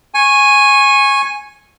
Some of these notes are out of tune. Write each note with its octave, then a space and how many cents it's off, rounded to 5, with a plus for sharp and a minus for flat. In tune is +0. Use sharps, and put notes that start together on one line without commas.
G#5 +0 C#6 -20